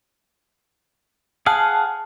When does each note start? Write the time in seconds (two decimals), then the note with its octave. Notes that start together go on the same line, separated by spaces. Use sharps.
1.46 G#4 F5 F#5 A5